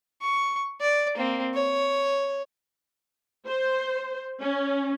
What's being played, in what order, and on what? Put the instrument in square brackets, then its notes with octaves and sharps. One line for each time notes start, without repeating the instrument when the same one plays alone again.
[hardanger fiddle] C#6
D5
A#3 C4
C#5
[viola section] C5
C#4